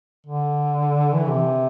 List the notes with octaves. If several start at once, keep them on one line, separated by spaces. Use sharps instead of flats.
D3
E3
C3